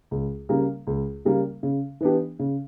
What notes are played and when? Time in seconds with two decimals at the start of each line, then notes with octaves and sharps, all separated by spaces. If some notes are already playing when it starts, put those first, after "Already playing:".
0.11 C#2
0.49 C#3 G3 A#3
0.87 C#2
1.25 C#3 G3 A#3
1.63 C#3
2.01 E3 B3 D4 G4
2.39 C#3